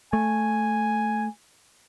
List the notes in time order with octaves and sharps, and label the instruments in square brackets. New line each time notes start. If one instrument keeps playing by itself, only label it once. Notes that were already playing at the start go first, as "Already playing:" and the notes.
[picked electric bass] A3 [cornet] G#5